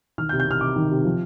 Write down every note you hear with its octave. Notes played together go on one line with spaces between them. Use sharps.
D#3 F6
G6
C3
G6
C3 F6
C3 D6
D#3
C3
F3